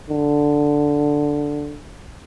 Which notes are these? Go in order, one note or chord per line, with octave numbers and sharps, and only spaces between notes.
D3